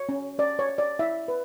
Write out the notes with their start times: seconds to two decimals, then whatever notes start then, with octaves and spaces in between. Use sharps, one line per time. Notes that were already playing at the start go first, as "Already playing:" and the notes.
Already playing: C#5
0.09 C#4
0.38 C#4 D5
0.59 C#5
0.69 C#5
0.78 D5
0.99 E4 E5
1.28 B4